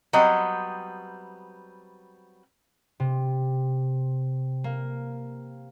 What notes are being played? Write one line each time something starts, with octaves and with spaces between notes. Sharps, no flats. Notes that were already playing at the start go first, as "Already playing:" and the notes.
F#3 G3 B3 C4 D#5
C3
A#3